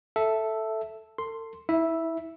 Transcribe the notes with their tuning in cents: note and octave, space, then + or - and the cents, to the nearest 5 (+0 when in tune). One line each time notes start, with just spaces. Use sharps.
A4 +0 E5 +0
A4 +40 C6 +0
E4 -25 E5 +0